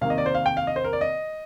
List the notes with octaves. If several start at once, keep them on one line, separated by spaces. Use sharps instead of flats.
C3 D#3 A#3 F5
D#5
D5
C5
F5
G5
F5
D#5
C5
A#4
D5
D#5